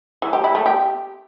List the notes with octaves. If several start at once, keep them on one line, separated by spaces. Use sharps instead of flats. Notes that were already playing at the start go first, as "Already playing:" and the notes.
E3
G4
E4
A3
G4